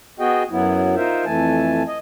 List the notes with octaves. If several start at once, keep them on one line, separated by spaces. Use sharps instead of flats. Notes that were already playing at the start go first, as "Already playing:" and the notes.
B3 F#4 G#4 D#5 G5
F#2 F#3 B3 E4
D#4 F4 A#4 C5 E5
F2 E3 A3 G#5 A5
D#5